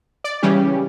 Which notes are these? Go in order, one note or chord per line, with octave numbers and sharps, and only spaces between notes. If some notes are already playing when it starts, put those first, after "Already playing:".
D5
C#3 E3 G3 C#4 G4